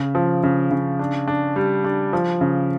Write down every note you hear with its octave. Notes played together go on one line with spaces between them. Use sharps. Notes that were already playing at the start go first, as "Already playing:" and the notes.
Already playing: C#3
F3
C#3
C#3
D4
D4
G3
D4
F3
C#3